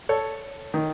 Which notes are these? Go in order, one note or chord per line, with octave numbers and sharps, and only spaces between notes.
A4 C#5
D#3